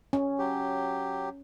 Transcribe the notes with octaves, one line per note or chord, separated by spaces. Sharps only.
C#4
F#3 G4